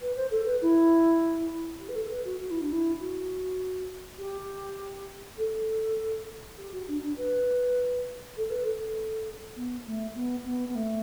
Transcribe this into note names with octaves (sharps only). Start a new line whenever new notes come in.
B4
C5
A4
B4
E4
G4
B4
A4
B4
F#4
F#4
E4
D4
E4
F#4
G4
A4
G4
F#4
D4
D4
B4
A4
B4
A4
B3
A3
B3
B3
B3
A3